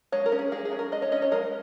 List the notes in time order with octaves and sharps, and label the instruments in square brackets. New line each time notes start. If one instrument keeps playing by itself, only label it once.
[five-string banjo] G#3 C#5
A#4
C#4
G#4
G#3 G#4
G#4
C#4
A#4
G#3 D#5
C#5
C#4 D#5
C#5
G#3 A#4